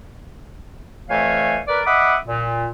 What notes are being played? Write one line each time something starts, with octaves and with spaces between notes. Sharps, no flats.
F2 E3 A3 C#5 F5 G#5
A#4 B4 D5
D#5 E5 F#5 B5 D6 D#6
A#2